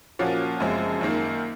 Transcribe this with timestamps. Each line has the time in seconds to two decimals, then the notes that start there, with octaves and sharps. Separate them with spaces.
0.19 A#2 F3 A#3 C#4 F#4
0.60 F#2 C#3 F3 G#3 C4
1.01 F#2 D#3 A#3